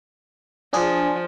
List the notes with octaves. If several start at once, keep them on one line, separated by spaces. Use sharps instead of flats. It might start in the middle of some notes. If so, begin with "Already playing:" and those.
F3 D4 G#4